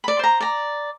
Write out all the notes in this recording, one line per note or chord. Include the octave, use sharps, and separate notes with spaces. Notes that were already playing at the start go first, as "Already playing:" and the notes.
D5 B5
C5 A#5
D5 A#5